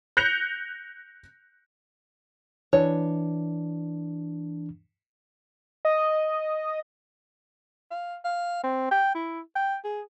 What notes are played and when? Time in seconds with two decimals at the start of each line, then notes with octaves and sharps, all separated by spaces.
0.17 F#6 G6 A#6 C#7 F7
2.73 E3 D4 C#5
5.85 D#5
7.91 F5
8.25 F5
8.63 C4
8.91 G5
9.15 E4
9.55 G5
9.84 G#4